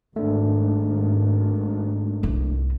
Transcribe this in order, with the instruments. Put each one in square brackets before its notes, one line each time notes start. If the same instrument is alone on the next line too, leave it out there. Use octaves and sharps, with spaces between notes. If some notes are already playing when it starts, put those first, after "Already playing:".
[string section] G#1 [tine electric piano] A3 D4
[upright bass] C2 C3